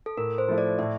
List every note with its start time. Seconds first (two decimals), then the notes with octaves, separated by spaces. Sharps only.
0.06 A4
0.17 A2 A#4
0.38 C5
0.48 F3 A3 E4
0.58 D5
0.79 A2 E5